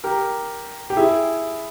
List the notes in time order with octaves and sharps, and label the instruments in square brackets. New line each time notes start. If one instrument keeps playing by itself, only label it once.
[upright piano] G4 A#4
G4
E4 G#4